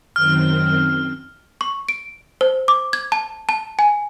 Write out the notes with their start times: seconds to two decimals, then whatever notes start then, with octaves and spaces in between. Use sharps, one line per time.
0.16 F#2 D#3 C4 F6
1.61 C#6
1.89 D7
2.41 C5
2.68 D6
2.93 G#6
3.12 A5
3.49 A5
3.79 G#5